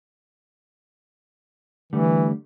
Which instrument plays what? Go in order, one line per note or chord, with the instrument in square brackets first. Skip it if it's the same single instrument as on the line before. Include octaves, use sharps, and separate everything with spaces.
[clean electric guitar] D3 G3 A3 [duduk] E3